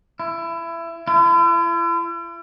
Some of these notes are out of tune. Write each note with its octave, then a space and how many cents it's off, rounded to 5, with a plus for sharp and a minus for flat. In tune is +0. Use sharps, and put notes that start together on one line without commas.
E4 +25
E4 +45